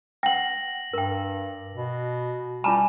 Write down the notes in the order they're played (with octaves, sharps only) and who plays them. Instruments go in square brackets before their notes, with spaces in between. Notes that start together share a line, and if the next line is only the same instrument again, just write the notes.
[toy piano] F#5 G5 [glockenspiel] A#6 F#7
[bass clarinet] G2 [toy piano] A#4 G5
[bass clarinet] B2
[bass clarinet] G3 [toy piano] F4 A5 B5 [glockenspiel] G#5 E7